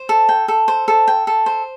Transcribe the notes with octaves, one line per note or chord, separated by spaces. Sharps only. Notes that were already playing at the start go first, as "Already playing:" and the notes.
Already playing: C5
A4
G5
A4
C5
A4
G5
A4
C5